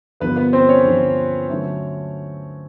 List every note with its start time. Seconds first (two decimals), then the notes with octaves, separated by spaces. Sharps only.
0.20 G2 D3 F3 A#3 B3 B4
0.36 B3 B4
0.53 C4 C5
0.69 C#4 C#5
0.85 G2 D3 F3 A#3
1.49 D3 F#3 A3 C#4